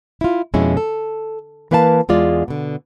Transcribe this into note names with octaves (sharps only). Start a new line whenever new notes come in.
E4 F4
F2 B2 G#3 C#4 E4
A4
E3 A#3 B4 F5 G5 A5
E2 G#3 F4 D5
B2 D3